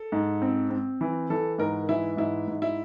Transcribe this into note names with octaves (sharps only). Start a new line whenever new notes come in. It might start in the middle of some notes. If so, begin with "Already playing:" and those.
Already playing: A4
G#2
C4
C4
E3
E3 A4
G#2 A#4
E3 E4
G#2 E4
G#2
E4